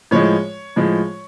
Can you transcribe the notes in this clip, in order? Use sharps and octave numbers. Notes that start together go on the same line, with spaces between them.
A2 F3 G#3 C#5
A2 F3 G#3